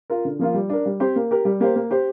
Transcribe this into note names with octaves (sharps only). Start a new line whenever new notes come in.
F4 A#4
D3
F3 A#3 F4
G3
D4 A#4
G3
C4 G4 C5
A#3
G4 A#4
G3
A#3 G4 C5
A#3
G4 C5